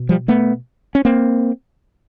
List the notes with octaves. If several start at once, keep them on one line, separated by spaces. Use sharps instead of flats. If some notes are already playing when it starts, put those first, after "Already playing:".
Already playing: B2
F3 G3
A3 B3
C#4
A#3 C4